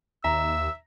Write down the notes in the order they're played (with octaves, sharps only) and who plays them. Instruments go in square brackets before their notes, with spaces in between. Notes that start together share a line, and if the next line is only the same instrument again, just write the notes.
[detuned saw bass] D#2 [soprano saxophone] E5 [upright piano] A#5 [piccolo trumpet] E6